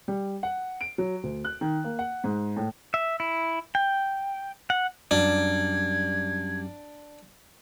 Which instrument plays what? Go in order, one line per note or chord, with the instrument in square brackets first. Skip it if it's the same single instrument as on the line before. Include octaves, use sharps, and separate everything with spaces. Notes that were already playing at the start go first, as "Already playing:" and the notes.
[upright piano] G3
F#5
D7
F#3
D2
F#6
D#3
A#3
F#5
G#2
A2
[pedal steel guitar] E5
E4
G5
F#5
[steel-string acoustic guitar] F#2 G3 [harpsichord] D4 [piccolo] G#6